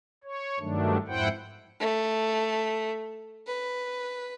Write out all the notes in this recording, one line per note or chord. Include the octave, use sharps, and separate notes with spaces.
C#5
G2 D#3 F#3 A3 D4
F2 G#2 E4 C5 F#5 G5
A3
B4